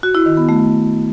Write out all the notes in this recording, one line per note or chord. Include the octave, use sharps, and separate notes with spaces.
F#4
E4
D#3
B3
A3